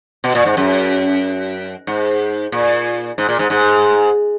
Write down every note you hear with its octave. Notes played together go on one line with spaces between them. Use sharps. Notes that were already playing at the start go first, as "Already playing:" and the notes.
B2
A#2
G#2
F#2
G#2
A#2
G#2
A#2
G#2
G#2